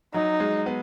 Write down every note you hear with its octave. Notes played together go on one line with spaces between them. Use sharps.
F#3 D#4
G#3
B3